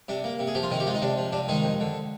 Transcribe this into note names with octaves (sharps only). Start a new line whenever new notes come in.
C3 D4
A#3
C3
G#4
F3 G4
F4
C3 D#3 D#4
G4
G#3 F4
D#4
C3 D4
F3
C3 D4
D#3 G#3 D#4
F2
D3